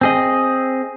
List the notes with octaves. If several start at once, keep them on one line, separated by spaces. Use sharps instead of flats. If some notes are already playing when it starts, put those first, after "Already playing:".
C4 G#4 D#5